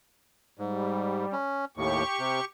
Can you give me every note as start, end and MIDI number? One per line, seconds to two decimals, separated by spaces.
0.59 1.25 44
0.59 1.35 55
1.33 1.65 61
1.77 2.03 39
1.77 2.03 45
1.77 2.45 67
1.77 2.45 85
2.19 2.40 48